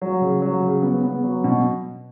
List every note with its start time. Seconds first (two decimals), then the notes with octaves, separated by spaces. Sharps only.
0.02 F#3
0.21 C#3
0.42 F#3
0.62 C#3
0.83 B3
1.03 B3
1.23 F#3
1.44 B2